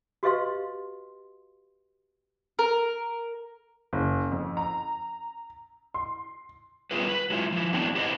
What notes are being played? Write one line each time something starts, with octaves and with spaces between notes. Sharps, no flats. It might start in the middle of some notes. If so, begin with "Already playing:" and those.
F#4 G4 B4 D#5 F5 C6
A#4
F#1
F2
A#5
C6
G3 B3 F4 G4 G#4 B4
B4
F#3 G#3 E4 F4
F3 E4
F#3 B3 C4 D4 E4
E4 G4 B4 C5 D#5